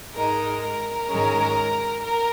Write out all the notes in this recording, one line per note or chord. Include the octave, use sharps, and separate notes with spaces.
G#2 G#3 D#4 A#4
A#4
G#2 D#3 G#3 C#4
A#4